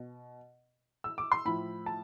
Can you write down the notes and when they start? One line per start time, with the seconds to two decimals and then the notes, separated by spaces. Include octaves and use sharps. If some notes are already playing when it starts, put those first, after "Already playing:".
Already playing: B2
1.04 E6
1.18 D6
1.32 C6
1.45 A2 F3 B5
1.86 A5